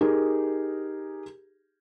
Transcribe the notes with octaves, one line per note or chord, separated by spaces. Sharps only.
D#4 G4 G#4 A#4